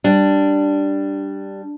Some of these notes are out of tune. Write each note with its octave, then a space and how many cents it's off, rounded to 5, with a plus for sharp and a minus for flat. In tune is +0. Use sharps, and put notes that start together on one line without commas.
G3 +0 D4 +0